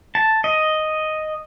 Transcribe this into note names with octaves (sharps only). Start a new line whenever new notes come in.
A5
D#5